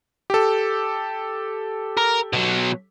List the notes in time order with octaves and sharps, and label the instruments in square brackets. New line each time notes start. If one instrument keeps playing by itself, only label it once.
[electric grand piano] G4 A4
[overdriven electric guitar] A#4
B2 F#3